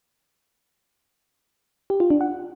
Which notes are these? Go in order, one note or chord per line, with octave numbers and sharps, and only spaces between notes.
G4
F4
D4
F#5